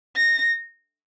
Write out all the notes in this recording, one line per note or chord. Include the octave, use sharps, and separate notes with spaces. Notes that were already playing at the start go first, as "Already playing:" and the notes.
A#6